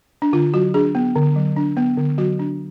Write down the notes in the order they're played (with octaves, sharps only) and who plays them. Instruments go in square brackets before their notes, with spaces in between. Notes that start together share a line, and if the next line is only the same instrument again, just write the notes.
[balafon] D4
D3 F4
F#3 F#4
D4 G#4
B3
D3
F#3
D4
B3
D3
F#3 F#4
D4